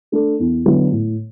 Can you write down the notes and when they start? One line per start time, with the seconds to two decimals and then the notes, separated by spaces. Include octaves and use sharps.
0.12 A3 D4 A4
0.39 E2
0.66 D3 F#3 B3 E4
0.92 A2